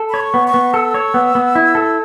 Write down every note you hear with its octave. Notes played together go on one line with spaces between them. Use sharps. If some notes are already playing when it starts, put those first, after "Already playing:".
Already playing: A4
C#5 B5
C#6
B3
C#6
B3
A4 E6
C#5
B3
B3
E4
A4